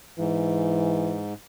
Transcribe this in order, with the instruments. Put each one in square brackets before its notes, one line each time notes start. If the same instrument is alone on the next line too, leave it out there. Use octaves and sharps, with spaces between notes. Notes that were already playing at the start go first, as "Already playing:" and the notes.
[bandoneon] G#2 [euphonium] E3